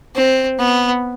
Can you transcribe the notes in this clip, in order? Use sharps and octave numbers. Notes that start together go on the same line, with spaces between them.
C4
B3